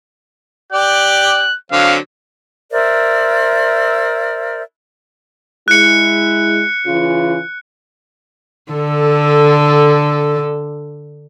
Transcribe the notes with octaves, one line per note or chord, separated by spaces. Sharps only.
G4 D5 F#6
D3 F#3 C4 F5
A#4 C5 D5 E5
G#3 E4 F#6 C#7
C#3 E3 F4
D3 A4